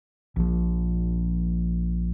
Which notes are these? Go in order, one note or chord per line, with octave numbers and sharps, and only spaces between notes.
A#1 F3